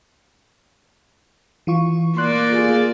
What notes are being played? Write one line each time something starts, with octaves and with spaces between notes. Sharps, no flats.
E3 F4 C#6
A#3 D5 C6 F#6
F4 G#4 A6